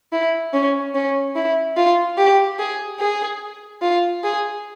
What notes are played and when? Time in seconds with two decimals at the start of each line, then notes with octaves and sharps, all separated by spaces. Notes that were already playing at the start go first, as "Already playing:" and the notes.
0.12 E4
0.53 C#4
0.94 C#4
1.36 E4
1.77 F4
2.17 G4
2.59 G#4
3.00 G#4
3.82 F4
4.24 G#4